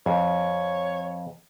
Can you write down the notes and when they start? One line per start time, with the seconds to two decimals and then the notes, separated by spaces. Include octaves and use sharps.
0.06 F2 C#5